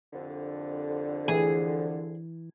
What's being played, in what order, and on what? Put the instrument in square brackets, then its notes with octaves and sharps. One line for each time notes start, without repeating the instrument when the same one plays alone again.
[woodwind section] C2 F2 D3
[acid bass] E3 [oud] G#4